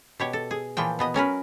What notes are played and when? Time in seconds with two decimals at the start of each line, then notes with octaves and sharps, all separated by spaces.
0.20 B2 G4 C#5
0.33 A4
0.51 G#4
0.77 A#2 E3 F3 G5
0.99 B2 B3 D#5
1.14 F#3 C#4 A#4 B4